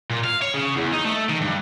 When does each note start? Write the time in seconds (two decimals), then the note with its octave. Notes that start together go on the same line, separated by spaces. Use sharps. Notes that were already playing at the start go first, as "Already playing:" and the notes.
0.10 A#2
0.24 F5
0.42 C#5
0.54 C#3
0.76 E2
0.93 D#4
1.05 A3
1.29 D#3
1.41 G2